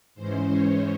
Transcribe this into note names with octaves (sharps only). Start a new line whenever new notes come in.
G#2 E3 G#3 C#4 C5
C#5